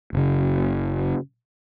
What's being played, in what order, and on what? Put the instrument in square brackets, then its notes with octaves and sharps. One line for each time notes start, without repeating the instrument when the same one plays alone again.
[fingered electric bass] F#1 C#3